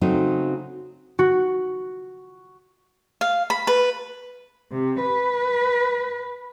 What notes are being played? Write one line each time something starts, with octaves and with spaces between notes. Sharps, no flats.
C#3 F#3 A3 C4 D#4
F#4
F5
B5
B4
C3
B4